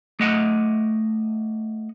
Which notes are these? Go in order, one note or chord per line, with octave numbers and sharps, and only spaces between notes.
A3 D#5 F#5